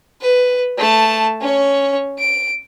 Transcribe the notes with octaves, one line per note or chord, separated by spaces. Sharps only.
B4
A3 A5
C#4 C#5
D7